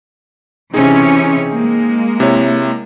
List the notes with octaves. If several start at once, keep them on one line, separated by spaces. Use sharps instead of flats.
C3 E3 C4 C#4 D#4 G#4
G#3 A#3
C3 E4 C#5